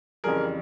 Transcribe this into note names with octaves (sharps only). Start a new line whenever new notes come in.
F2 C#3 E3 G3 G#4 A#4